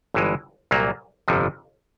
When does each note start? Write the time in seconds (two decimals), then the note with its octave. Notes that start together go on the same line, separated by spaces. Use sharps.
0.14 G1 G2 E3 G#3
0.71 C2 A#2 F#3 A#3
1.28 G1 F2 C3 F3